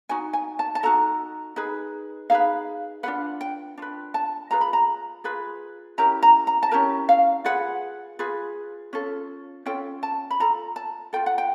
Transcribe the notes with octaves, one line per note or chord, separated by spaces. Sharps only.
D#4 F#4 G#5
G#5
A5
A5
D#4 F#4 A4 A#5
D#4 G#4 B4
D#4 G#4 B4 F5
D4 F4 G#4 B4 F#5
G5
D4 F4 B4
A5
F4 G#4 B4 A#5
B5
A#5
F4 G#4 B4
C#4 E4 G4 A#4 A#5
A#5
A#5
A5
C#4 E4 G4 A#4 A#5
F5
F4 G#4 B4 F#5
F4 G#4 B4
C#4 F4 A4
C#4 F4 A4 G5
A5
B5
F4 A4 A#5
A5
F4 A4 G5
F#5
G5